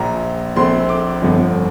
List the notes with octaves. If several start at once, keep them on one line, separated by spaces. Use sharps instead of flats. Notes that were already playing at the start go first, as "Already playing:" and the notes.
Already playing: A#1 A#2 F3 A#5
A#1 A#2 A3 C4 C6
D6
G1 F2 D3 F3